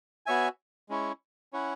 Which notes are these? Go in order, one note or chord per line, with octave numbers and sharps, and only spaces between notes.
B3 F#4 C#5 E5 G#5
G#3 C#4 E4 C#5
C#4 E4 C#5 F#5